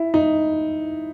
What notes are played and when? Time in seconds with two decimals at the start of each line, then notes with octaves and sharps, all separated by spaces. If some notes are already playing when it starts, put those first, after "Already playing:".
Already playing: E4
0.14 D#4